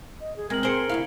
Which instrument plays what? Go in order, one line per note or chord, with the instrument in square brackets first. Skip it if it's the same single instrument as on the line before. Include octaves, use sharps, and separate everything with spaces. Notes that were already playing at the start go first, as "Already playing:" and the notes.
[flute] D#5
G#4
[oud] G#3 [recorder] C4 [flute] A#4 [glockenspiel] G#6 F#7
[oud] G#4 C5 [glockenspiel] C#7 D7 G7
[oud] D2 C#3 F5 [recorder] E4